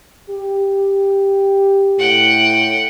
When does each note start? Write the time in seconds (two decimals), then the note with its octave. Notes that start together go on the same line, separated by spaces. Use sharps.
0.30 G4
1.99 A2 F#5 G5